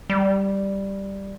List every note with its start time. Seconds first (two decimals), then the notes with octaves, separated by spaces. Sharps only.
0.10 G3